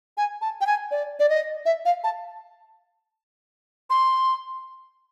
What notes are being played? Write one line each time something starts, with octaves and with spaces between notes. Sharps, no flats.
G#5
A5
G5
G#5
D5
D5
D#5
E5
F5
A5
C6